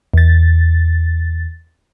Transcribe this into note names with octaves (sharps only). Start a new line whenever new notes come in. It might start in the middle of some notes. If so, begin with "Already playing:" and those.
E2 A6